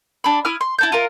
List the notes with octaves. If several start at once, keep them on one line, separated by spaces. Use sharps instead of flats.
D4 B5
E4 D#6 F6
C6
E4 A5 G6
F4 A#4